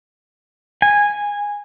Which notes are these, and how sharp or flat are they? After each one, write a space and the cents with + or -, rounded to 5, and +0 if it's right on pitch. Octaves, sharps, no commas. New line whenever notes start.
G#5 -10